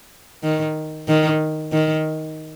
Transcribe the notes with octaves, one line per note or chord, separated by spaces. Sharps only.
D#3
D#3
D#3